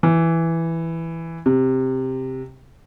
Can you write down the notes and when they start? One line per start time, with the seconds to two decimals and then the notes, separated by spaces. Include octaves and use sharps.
0.03 E3
1.46 C3